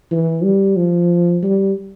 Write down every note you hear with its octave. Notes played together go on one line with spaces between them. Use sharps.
E3
G3
F3
G3